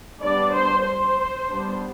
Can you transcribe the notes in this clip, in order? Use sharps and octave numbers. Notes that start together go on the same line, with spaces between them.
G3 B3 D4 D5
C5
C5
G3 B3 D4